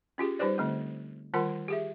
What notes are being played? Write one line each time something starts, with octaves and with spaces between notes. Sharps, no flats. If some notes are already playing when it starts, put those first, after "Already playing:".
C#4 F4 G4 G#4
G3 D#4 G4 B4 C5 D5
D3 A3 C4
D#3 G3 F4 A#4 F#5 C6
G4 G#4 E5